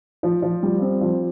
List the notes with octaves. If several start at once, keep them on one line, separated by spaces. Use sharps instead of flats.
F3
F3
G3
C4
F3